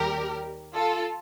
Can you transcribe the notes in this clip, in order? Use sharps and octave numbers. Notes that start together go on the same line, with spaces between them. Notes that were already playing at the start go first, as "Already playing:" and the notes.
Already playing: D#2 D#3 G3 G4 A#4
F4 A4